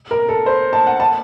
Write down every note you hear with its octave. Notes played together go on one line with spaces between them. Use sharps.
A#4
A4
C5
A5
F#5
A5